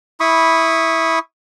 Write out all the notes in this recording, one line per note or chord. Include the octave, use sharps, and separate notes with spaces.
E4 B5 C#6 D#6